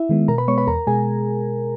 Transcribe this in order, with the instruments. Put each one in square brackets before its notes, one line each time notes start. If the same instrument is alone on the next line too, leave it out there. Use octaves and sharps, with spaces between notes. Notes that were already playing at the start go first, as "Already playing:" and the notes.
Already playing: [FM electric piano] E4 E5
D#3 G#3 B3
B2 A#4 A#5
B4 B5
G#3 B3 C#5 C#6
B4 B5
E2 A#4 A#5
B2 G#3 G#4 G#5